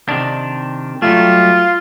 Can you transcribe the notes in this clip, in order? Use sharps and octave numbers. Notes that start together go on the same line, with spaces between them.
C3 D#3 D4
F#3 G3 A3 F4